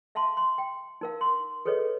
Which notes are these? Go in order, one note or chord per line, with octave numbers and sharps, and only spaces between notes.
E5 F5 A5 C6
C6
G5
D#4 A#4 F5
C6
G#4 A4 B4 C#5 D#5